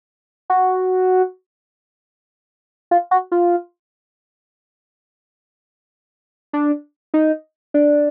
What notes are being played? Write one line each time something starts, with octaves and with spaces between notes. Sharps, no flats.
F#4
F4
F#4
F4
D4
D#4
D4